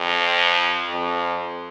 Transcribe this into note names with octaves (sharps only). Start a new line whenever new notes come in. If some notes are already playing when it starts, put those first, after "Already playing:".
Already playing: F2
F2